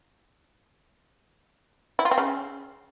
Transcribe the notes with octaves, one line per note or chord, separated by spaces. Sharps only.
E4
F4
C4
C#3